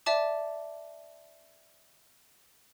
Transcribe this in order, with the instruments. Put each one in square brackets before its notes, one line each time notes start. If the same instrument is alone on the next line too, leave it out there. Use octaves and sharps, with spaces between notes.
[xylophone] D5 E5 A5 D6